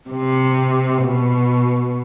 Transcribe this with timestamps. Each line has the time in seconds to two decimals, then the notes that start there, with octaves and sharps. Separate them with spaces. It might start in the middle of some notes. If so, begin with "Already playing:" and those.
0.10 C3
1.04 B2